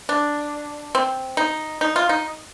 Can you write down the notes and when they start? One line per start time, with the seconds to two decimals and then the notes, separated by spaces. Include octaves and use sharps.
0.09 D4
0.95 C4
1.37 D#4
1.81 D#4
1.96 F4
2.09 D#4